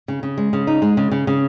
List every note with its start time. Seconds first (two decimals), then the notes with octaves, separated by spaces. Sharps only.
0.08 C#3
0.23 C#3
0.38 G#3
0.53 C#3
0.67 D#4
0.82 G#3
0.97 C#3
1.11 C#3
1.27 C#3